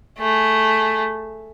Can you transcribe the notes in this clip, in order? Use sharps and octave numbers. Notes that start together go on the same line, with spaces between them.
A3 G#4